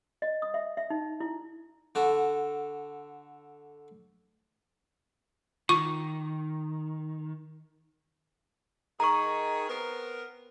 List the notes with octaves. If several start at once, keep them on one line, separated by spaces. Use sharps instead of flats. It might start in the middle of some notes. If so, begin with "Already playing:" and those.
D#5
D#6
E5
E5
D#4
E4
D3 F#4 A4
D#3 F4 C#6
D#3 G#4 A#5 C#6
B3 C4 A#4